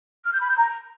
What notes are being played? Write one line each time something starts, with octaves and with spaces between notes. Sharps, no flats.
F6
G6
B5
G6
A#5